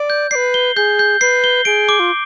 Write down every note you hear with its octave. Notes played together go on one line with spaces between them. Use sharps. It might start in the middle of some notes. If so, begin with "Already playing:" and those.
Already playing: D5
G6
B4 D5 C7
G7
G#4 G6
G6
B4 C7
G7
G#4 D7
D6
F4